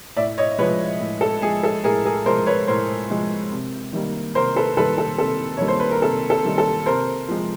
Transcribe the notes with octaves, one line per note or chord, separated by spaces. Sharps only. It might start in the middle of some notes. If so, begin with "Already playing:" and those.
A2 D5 E5
C#5 D#5
F3 G#3 B4 C#5
A2
A4
F3 G#3 G#4
A4
A2 G#4 A#4
G#4 A#4
F3 G#3 A#4 C5
B4 C#5
A2 A#4 C5
F3 G#3
C3
D#3 G3 A#3
C3 A#4 C5
A4 B4
D#3 G3 A#3 A4 B4
A4
C3 A4
D#3 G3 A#3 C#5
C5
B4
A#4
C3 A4
A4
D#3 G3 A#3
A4
C3 A#4 C5
F3 G#3